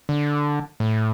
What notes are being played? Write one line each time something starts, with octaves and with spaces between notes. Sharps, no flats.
D3
A2